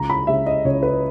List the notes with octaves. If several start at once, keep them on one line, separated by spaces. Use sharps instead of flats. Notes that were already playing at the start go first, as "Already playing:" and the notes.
Already playing: C#2 A#5
B5
C#3 G#3 E5
D#5
C#2 C#5
B4